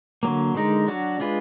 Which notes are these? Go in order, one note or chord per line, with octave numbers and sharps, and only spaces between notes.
D3 F#3 A#3
D3 G#3 D#4 A#4
F#3 D4 F#4
G#3 D4 F4 B4